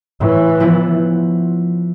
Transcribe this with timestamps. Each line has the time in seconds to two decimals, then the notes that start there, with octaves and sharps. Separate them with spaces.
0.21 A2 E3
0.60 F3 B3 E4